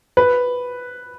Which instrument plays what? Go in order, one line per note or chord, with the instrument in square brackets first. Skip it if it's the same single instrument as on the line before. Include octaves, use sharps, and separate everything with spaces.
[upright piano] B4